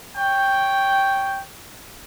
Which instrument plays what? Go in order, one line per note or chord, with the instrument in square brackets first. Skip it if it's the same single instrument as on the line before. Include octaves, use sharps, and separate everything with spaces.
[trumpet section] C#5 G5